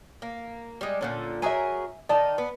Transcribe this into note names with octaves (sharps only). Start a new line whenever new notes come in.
A#3
G3 G#3
A#2 D3 C#4 A4
F#3 G#4 A#4 E5 G#5
D#3 D#4 D5 A5 A#5
B3